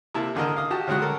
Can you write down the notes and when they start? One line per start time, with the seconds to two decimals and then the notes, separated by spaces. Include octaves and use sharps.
0.14 C3 A#3 E4 A5
0.35 G#1 D3 A#4 D#5
0.57 F5 D#6
0.70 F#4 G4 G5 A5
0.87 D2 C#3 F#3 G#3 F#4 F#5
1.02 A4 A#4